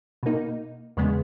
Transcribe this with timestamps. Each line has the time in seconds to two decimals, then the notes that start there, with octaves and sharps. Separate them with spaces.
0.23 B2 A#3 D#4
0.97 E2 C#3 G#3 B3